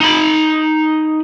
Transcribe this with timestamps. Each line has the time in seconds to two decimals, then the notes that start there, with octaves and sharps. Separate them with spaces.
0.01 D#4 B5